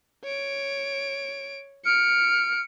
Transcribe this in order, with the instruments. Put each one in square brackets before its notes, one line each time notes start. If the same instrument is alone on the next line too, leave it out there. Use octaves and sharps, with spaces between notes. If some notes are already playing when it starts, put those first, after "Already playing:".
[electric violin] C#5 D7
[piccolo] F6 [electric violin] C#7 D7